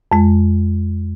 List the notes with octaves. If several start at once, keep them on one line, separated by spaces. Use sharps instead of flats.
F2 G#3